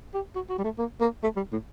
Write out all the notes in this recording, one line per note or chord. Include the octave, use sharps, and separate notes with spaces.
G4
F#4
F#4
G3
A3
A#3
A#3
A3
G3
A2